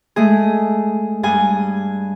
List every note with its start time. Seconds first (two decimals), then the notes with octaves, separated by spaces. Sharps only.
0.16 G#3 A3 G#4
1.23 G2 G#4 G#5